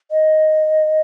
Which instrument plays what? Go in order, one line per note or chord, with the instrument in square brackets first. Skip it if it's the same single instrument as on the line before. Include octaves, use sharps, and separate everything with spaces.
[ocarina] D#5